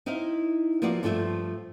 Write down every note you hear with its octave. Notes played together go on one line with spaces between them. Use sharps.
D#4 E4 C5 E5 F5
F3 A#3 B3 E4 F#4 D5
G2 F3 A3 F4 C5 E5